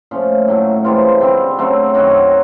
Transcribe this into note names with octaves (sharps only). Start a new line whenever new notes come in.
A#2 F3 A3 C#4
A2 F#3 A3
C3 E3 G#3 F4
D3 G3 C4
C#3 F#3 A3 C4
F#2 D#3 F#3 F#4